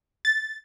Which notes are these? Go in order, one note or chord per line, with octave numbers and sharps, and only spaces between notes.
A6